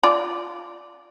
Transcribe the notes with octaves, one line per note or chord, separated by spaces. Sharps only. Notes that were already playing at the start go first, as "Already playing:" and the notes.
F4 D5